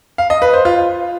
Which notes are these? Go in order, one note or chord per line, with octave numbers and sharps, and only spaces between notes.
F5
D#5
B4
C5
F4